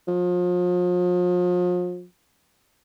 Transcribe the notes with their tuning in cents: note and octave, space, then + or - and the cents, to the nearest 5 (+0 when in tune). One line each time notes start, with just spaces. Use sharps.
F3 +40